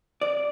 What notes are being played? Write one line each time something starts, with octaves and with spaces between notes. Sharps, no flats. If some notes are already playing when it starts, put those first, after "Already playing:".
D5